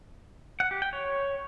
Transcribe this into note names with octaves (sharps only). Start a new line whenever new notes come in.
F#5
G4
G5
C#5